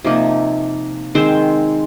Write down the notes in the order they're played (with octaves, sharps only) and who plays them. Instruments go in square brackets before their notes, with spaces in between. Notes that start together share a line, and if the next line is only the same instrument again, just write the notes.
[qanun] C3 F3 A#3 D#4
D#3 G#3 C4 D#4 C5